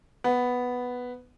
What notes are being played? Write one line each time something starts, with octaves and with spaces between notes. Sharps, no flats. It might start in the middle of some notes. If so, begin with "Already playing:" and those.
B3